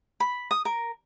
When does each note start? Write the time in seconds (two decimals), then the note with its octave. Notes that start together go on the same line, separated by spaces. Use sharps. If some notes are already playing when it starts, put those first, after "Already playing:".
0.20 B5
0.51 D#6
0.65 A#4